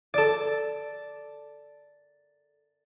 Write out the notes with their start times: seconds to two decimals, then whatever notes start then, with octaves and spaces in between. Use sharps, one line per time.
0.14 A4 D5